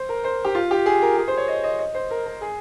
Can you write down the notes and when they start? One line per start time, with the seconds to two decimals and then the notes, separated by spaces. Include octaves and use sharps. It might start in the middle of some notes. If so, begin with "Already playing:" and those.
Already playing: C5
0.09 A#4
0.24 C5
0.45 G4
0.55 F4
0.71 G4
0.86 G#4
1.02 A#4
1.17 G#4
1.28 C5
1.37 C#5
1.48 D#5
1.64 D#5
1.79 D#5
1.95 C5
2.11 A#4
2.26 A#4
2.41 G#4